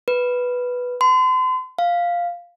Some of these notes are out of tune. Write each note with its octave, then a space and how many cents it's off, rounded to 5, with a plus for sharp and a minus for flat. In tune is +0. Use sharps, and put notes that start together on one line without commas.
B4 -5
C6 -40
F5 +0